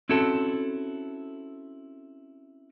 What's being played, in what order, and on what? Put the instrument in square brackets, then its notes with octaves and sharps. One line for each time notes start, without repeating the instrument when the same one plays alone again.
[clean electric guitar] C4 C#4 E4 F#4 A4